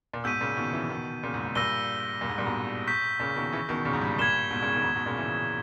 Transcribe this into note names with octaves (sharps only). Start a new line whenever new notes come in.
A#2
G#2 B2 E6 G6 B6 D#7
A#2 C#3
B2 D#3
C#3 E3
B2 D#3
A#2 C#3
G#2
G#2
G2 A#2 E6 A#6 D#7 G7
G2 A#2
G#2
G2 A#2
G#2 B2
C#6 G6 B6
A#2 C#3
B2 D#3
C#3 E3
B2 D#3
A#2 C#3
G#2
G2
G#2
G2 A#2 G#6 B6 E7 G7
G#2 B2
A#2 C#3
B2 D#3
G#2 B2
G#2 B2
A#2 C#3
C#3 E3